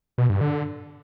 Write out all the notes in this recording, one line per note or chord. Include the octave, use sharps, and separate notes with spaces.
B2
G2
D3